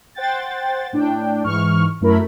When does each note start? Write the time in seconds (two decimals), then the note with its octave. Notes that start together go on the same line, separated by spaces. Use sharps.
0.15 C5 F#5 G5 A6
0.93 A2 D4 G5
1.44 G#2 E3 C#6 F6
2.01 F#2 A3 E4 A#4 B5